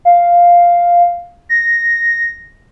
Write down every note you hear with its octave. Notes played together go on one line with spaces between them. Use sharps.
F5
A#6